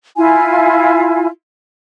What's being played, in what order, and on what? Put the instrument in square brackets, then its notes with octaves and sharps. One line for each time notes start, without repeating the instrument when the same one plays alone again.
[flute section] E4 F4 G#5